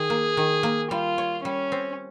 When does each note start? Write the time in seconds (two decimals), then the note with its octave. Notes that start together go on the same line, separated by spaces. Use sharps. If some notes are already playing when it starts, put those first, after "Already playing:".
Already playing: D#3 G#4
0.10 A#3
0.37 D#3
0.63 A#3
0.91 G3 F4
1.18 C#5
1.44 G3 C#4
1.72 C4